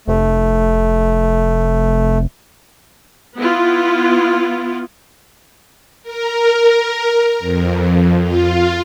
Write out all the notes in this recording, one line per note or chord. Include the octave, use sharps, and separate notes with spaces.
F1 A3
B3 E4 F4
A#4
F2
F4